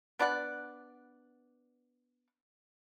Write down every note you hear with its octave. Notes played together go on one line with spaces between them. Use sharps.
B3 D4 D5 F#5